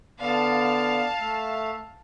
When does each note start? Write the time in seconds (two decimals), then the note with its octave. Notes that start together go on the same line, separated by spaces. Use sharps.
0.21 D3 B3 D5 F5 A5
1.20 A3 E5